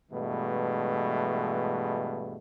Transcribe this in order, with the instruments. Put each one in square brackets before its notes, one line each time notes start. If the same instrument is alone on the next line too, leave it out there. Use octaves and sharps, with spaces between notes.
[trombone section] G2 B2 E3 G#3 A3